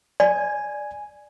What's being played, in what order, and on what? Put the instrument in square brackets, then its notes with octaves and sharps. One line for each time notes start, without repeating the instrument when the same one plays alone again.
[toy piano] D5 [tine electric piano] G#5